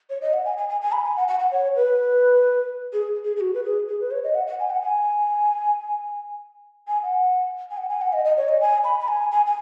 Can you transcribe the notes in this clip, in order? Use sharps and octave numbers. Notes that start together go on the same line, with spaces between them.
C#5
D#5
F#5
G#5
G#5
G#5
G#5
B5
G#5
F#5
F#5
F#5
C#5
B4
G#4
G#4
G#4
F#4
B4
G#4
G#4
B4
C#5
D#5
F#5
F#5
G#5
F#5
G#5
G#5
F#5
G#5
F#5
G#5
F#5
D#5
D#5
C#5
D#5
G#5
B5
B5
G#5
G#5
G#5